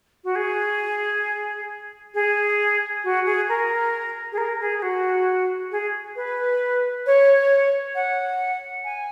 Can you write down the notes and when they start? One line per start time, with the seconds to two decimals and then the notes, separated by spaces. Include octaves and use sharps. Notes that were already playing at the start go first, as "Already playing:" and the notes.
0.24 F#4
0.35 G#4
2.14 G#4
3.03 F#4
3.25 G#4
3.48 A#4
4.32 G#4
4.37 A#4
4.60 G#4
4.78 G#4
4.82 F#4
5.71 G#4
6.15 B4
7.06 C#5
7.95 F#5
8.84 G#5